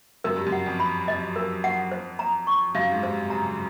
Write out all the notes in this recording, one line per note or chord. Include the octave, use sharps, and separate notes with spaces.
F#2 A#4
G2
F#2
F#5
F2
B5
F2 D#5
A#4
F#5
C5
A#5
C#6
F#2 F5
G#2
G2 C5
C3
C#3 A#5